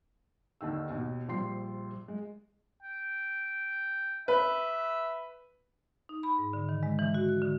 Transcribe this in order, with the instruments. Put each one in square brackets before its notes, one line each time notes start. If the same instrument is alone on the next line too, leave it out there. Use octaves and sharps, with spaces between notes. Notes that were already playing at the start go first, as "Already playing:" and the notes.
[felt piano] D#2 D3 D#3 E6
D#2 B2
A#1 F3 G3 C6 C7
G#3
[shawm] G5
[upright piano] B4 [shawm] E5
[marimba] D#4
B5
G#2
D3
D#3
G#3
E3
F#4
F#6
D3